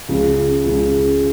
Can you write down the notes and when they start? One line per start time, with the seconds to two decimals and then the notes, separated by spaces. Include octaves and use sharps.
0.09 C#2 C#3 G#3
0.65 C#2 C#3 G#3